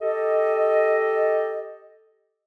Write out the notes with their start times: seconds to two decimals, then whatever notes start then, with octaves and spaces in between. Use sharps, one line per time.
0.02 G4 A4 D#5